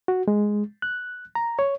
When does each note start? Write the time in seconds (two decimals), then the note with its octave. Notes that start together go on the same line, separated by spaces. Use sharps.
0.08 F#4
0.28 G#3
0.82 F#6
1.35 A#5
1.59 C#5